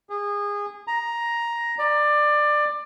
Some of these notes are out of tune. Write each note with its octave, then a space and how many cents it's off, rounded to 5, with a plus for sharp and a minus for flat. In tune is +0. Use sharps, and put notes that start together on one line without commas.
G#4 -25
A#5 +10
D5 +20